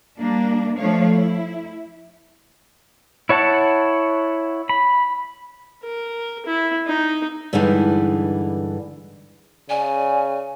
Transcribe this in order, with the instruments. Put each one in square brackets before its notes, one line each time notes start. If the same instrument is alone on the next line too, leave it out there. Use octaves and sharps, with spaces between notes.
[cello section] G3 A#3 D4
F3 A3 D4 C#5 F5
E4
[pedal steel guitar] E4 C#5 F#5 A5
B5
[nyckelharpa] A#4
E4
D#4
[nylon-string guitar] G2 D3 E3 G3 G#3 D#4
[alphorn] C#3 [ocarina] D5 [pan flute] G#5